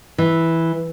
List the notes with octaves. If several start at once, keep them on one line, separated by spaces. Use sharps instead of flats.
E3